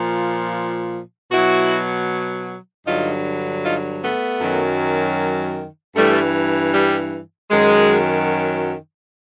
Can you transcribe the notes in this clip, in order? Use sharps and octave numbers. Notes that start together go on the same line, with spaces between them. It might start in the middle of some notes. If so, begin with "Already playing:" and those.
Already playing: A#2 F3
B2 F#3 E4 F#4
G2 D3 F#3 D#4 F4
D#4 F4
A3 B3
F#2 D#3 F#3
G2 E3 G3 A3
G3
F#2 D#3 F#3 G#3